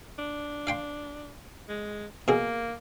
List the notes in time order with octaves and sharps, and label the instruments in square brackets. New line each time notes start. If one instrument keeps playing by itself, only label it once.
[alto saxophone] D4
[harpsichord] F5 G5 C6
[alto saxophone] G#3
[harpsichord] B2 G#4 [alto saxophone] A#3